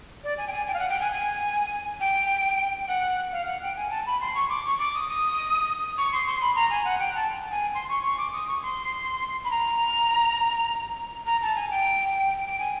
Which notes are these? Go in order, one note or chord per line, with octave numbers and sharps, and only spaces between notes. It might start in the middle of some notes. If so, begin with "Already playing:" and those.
D5
G#5
G5
G#5
G5
F5
F#5
G5
G#5
G#5
G5
F#5
F5
F#5
G5
G#5
A5
B5
C6
C#6
D6
C#6
D6
D#6
D#6
C#6
C6
C6
B5
A#5
G#5
F#5
G5
A5
G#5
C6
C#6
C#6
D6
D#6
C#6
C6
B5
A#5
A#5
A5
G#5
G5
G5
G#5